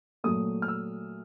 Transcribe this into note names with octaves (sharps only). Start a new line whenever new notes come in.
A#2 F#3 A3 D#6
F6
E6